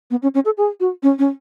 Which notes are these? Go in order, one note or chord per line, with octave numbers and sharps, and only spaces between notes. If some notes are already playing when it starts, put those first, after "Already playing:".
B3
C#4
C#4
A4
G#4
F#4
C#4
C#4